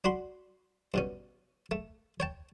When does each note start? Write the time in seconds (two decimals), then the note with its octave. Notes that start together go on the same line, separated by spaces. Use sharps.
0.04 D4 F#4 B5 C6
0.94 G2 B2 C#4
1.71 A3
2.20 C#5 G5 A5